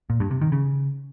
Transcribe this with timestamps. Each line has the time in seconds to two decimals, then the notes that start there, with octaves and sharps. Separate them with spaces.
0.10 A#2
0.20 G2
0.31 C3
0.41 D#3
0.52 C#3